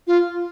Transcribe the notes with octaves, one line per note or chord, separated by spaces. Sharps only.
F4